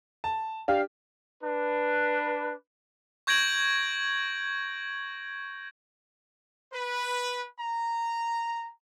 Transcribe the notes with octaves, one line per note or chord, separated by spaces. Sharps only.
A5
D4 G4 F5
D4 B4
C#6 G6 G#6 A#6 D7 F#7
B4
A#5